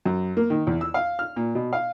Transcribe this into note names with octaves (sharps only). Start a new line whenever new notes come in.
F#2
A#3
D#3
E2
E6
F5
F6
A#2
B2
F5